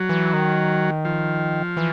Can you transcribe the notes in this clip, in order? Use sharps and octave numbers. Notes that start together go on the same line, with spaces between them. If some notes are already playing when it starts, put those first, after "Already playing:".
Already playing: F#3
E3
D#3
F3
E3